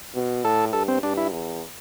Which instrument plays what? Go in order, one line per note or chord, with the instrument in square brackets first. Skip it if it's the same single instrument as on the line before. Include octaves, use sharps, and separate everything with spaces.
[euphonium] B2
[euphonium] A2 [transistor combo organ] A4
[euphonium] G2 [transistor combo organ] A4
[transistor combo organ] C4
[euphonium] G2 [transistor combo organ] D4
[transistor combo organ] E4
[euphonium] E2